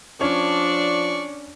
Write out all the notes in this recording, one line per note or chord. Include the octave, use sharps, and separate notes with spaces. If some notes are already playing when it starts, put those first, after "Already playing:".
F3 C#4 D4 C#5 D5 C#6